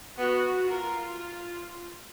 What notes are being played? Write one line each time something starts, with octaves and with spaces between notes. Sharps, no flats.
B3 F#4
F4 A#4